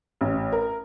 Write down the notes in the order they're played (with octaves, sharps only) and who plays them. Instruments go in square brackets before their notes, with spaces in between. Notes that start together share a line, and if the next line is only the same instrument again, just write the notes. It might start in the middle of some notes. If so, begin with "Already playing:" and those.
[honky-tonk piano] A1
A#4